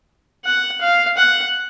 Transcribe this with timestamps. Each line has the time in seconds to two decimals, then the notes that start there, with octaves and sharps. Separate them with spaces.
0.45 F#5
0.81 F5
1.17 F#5